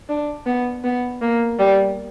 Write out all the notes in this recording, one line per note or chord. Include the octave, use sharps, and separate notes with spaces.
D4
B3
B3
A#3
G3